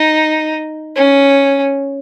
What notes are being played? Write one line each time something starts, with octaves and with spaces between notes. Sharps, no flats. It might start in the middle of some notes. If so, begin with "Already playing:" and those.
Already playing: D#4
C#4